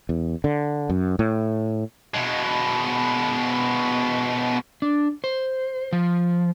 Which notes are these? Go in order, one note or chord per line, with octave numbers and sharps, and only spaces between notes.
E2
D3
F#2
A2
B2 G#3
D4
C5
F3